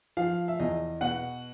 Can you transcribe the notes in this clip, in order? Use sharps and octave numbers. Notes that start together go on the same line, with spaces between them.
F3 F5
E5
E2 D#5
B2 F#5